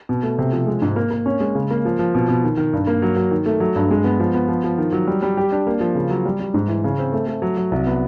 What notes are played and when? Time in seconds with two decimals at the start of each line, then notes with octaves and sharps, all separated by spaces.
0.09 B2
0.23 A3
0.39 C3
0.53 F3
0.67 G#3
0.82 G#2
0.96 A#3
1.11 A#3
1.26 C#4
1.40 G#3
1.55 C#3
1.70 A#3
1.85 F3
1.99 F3
2.15 B2
2.28 B2
2.44 D#3
2.57 D#3
2.73 G2
2.87 A#3
3.02 F#3
3.16 F#3
3.31 D#3
3.46 A3
3.60 F#3
3.76 G2
3.91 G#3
4.04 B3
4.20 F3
4.34 B3
4.48 F3
4.64 F3
4.78 D#3
4.92 F#3
5.07 G3
5.22 G3
5.37 G4
5.52 D4
5.67 A#3
5.81 F3
5.95 C#3
6.10 F#3
6.25 G3
6.40 G3
6.54 G#2
6.68 E3
6.84 C#3
6.99 C4
7.13 A3
7.27 A3
7.42 F#3
7.57 F#3
7.71 C2
7.87 B3